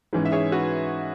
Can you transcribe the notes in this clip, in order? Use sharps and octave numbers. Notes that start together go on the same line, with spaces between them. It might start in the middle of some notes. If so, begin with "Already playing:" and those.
G#2 E3 C#4
E5
G#4 C#5
F#4 B4